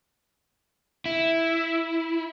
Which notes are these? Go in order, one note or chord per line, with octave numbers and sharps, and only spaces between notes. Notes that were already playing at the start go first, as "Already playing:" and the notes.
E4